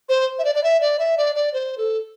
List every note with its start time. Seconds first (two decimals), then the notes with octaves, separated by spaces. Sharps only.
0.09 C5
0.39 E5
0.44 D5
0.55 D5
0.63 E5
0.81 D5
0.99 E5
1.17 D5
1.35 D5
1.54 C5
1.78 A4